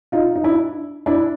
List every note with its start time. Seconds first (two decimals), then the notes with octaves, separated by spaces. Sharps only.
0.12 D#4 F4
0.36 D#4
0.44 D4 E4
1.06 D4 E4